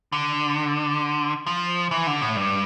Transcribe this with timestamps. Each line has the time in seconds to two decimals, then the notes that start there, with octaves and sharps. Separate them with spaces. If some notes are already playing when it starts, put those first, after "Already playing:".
0.12 D3
1.47 F3
1.91 E3
2.07 D3
2.22 A2
2.36 G2